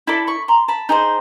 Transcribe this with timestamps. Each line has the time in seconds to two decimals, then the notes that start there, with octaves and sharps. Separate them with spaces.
0.07 E4 A4 D5 A5 B5
0.27 B5 C#6
0.48 A#5 C6
0.68 A5 B5
0.89 D#4 G#4 C5